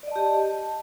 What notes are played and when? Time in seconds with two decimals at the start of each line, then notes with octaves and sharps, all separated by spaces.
0.03 D5
0.07 D#5
0.11 A5
0.16 G4